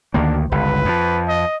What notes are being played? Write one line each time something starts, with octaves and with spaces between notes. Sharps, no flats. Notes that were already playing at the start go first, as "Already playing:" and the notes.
D2 D#3 A#3 D4
G1 C#2 B4
F2 F3
D#5